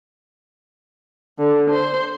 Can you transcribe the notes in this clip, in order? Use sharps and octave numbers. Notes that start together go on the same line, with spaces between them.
D3
C5